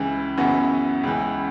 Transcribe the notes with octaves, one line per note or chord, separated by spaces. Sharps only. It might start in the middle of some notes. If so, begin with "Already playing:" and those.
Already playing: C#2 C#3 E3
F#2 C#3 E3 B3
C#2 C#3 E3